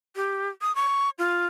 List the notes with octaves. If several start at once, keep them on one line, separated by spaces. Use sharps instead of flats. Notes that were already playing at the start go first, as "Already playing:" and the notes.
G4
D#6
C#6
F4